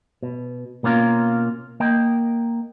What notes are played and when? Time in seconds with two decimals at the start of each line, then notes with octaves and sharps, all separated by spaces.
0.23 B2
0.83 B2 A#3 C#4 F4 A#4
1.80 A#3 D#5 G5